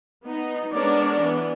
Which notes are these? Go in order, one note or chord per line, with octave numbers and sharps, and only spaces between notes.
B3 D#4
G#3 B3 D4 A#4 C#5 D5
E3 B3